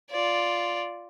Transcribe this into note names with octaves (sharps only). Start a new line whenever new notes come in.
F4 D5